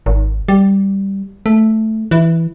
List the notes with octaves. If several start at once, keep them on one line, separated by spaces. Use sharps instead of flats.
G#1
G3
A3
E3